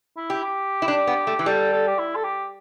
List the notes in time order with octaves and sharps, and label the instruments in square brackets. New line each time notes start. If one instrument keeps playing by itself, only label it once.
[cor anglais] E4
[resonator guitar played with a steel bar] G4
[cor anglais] G4
[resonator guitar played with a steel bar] E4
D4
B3
A3
E3
[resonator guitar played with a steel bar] G3 [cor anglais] A4
[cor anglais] A4
G4
E4
A4
G4